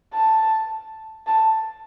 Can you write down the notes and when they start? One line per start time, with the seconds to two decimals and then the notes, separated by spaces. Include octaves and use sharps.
0.13 A5
1.27 A5